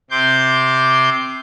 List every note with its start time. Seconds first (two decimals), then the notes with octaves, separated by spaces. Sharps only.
0.11 C3 C6 D6 G6